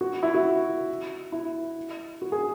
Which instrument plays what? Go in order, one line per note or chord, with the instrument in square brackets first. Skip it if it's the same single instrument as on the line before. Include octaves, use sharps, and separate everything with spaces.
[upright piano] F#4
E4
F#4
E4
F#4
G#4